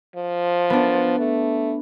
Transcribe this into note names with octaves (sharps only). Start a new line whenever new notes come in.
F3
B3 D4
A3